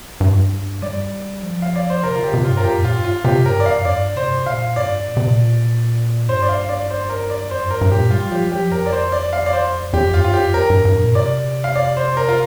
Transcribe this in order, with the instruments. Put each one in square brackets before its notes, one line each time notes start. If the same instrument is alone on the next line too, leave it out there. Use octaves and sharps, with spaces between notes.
[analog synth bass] G2
[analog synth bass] G3 [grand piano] D5
[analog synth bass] F3
[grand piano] F5
D5
C5
[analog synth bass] C3 [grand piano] A#4
[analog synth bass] D3 [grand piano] F4
[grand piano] G4
[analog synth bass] C3
[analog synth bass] G2 [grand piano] F4
[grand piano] A#4
[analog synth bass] F2 [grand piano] G4
[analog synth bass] A#2
[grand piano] F4
[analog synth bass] G2
[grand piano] F4
[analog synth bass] C3 [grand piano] G4
[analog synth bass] G2 [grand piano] A#4
[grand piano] D5
[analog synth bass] F2 [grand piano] F5
[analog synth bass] G2 [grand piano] D5
[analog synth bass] C3 [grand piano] C5
[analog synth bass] A#2 [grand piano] F5
[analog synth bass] G2 [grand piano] D5
[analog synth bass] A#2
C3
A#2
[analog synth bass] G2 [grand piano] C5
[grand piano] D5
F5
D5
C5
A#4
D5
[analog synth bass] F2 [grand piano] C5
[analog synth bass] G2 [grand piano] A#4
[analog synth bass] G2
[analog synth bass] A#2 [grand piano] G4
[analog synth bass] G3 [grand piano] F4
[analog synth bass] F3 [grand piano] G4
[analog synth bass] G3
[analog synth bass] F3 [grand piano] G4
[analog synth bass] F2 [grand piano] A#4
[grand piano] D5
C5
D5
F5
D5
C5
[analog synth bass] F2 [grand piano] G4
[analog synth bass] G2 [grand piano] F4
[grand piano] F4
[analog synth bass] F2 [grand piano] G4
[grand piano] A#4
[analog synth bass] G2
G2
A#2
[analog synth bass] C3 [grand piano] D5
[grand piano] F5
D5
C5
A#4
F4